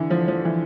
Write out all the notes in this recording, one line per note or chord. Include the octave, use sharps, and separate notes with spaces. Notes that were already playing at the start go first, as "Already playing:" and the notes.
Already playing: D3 E3
F3
F3
E3